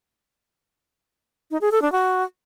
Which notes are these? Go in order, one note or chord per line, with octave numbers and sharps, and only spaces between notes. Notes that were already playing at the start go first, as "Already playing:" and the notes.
D#4
G#4
A4
D4
F#4